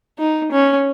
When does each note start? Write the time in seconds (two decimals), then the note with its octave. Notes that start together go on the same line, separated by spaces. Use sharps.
0.19 D#4
0.52 C#4